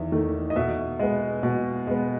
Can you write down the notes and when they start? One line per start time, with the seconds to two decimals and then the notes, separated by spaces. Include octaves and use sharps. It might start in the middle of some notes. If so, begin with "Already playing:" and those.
Already playing: E2 D#3 E5
0.12 D#3 A3
0.50 D#5
0.56 B2 E5
0.99 G#3 B3
1.43 B2
1.87 G#3 B3